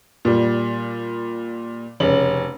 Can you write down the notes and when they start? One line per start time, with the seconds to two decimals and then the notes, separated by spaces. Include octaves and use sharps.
0.25 A#2 G3
2.00 F1 C#3 C#4 F#7